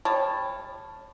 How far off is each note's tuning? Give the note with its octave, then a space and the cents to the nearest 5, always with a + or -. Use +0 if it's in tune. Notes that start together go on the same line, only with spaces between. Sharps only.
G3 +25 C#5 -15 A5 +0